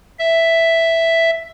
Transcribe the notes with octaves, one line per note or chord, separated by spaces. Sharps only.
E5